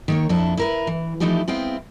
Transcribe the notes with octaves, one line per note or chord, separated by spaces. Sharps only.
D#3 A#3 C#5
F2 A#2 D4 E4 A4
E4 A#4 B4
E3
E3 F3 A3 D#4 E4 G4
G#3 B3 C4 E4 F5 G5